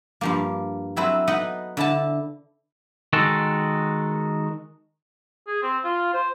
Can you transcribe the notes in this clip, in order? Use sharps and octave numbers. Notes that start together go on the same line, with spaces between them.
G2 F3 A#3
F#3 C4 E4 A4 B4
B3 D#4 B4 D#5 F#5
D3 E4 A4 A5
D#3 G#3 F#4 A4
G#4
C4
F4
C5